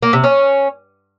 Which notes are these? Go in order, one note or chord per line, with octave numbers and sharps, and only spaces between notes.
A#3
C3
C#4